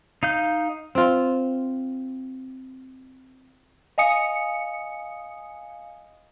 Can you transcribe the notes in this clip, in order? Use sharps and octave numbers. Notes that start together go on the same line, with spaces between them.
D#4 F5 G6
C4 F4
D#5 F5 G#5 D#6 C#7